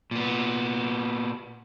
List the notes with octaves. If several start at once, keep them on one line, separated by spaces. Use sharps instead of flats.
A#2 B3